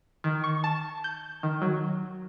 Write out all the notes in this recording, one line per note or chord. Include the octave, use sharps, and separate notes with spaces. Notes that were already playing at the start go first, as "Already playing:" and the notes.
D#3
C#6
A5
G6
D#3
F#3